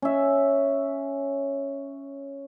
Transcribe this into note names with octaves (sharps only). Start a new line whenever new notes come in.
C#4 E5